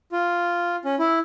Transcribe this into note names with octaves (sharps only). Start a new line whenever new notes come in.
F4
C#4
E4